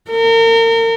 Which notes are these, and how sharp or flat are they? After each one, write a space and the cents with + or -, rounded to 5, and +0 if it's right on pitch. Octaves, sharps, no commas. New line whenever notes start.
A#4 -35